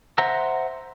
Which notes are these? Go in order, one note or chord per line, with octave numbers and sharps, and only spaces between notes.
C5 E5 F#5 A#5 E6